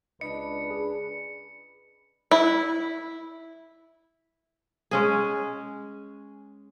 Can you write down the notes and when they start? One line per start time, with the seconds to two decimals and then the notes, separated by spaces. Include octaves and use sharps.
0.21 C#2 D4 B4 D#5 C#7
0.70 G#4
2.31 E4
4.91 G#3 C#4 G#4